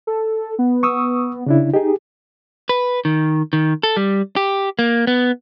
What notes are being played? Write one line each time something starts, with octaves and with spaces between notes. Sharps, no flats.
A4
B3
C#6 D#6 E6
C#3 D4 E4
D#4 G4 G#4
B4
D#3
D#3
A4
G3
G4
A#3
B3